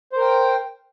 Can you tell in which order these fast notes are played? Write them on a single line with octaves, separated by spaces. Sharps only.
C5 A#4 G5